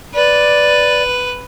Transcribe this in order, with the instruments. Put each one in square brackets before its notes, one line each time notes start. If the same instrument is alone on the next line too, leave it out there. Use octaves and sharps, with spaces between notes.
[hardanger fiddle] B4 [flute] D5